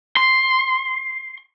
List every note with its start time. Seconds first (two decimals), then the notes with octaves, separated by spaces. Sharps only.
0.17 C6